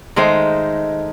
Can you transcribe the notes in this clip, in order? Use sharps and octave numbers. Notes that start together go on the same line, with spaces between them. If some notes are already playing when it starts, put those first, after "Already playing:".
D#3 G#3 A3 D#4 C5